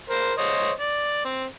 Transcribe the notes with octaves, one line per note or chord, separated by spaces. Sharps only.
A#4 C5
C5 C#5 D#5
D5
C4